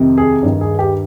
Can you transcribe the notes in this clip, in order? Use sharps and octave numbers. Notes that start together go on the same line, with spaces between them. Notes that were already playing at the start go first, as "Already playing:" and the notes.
Already playing: F2 C3 D#3
G#4
G2 D#3
G#4
G4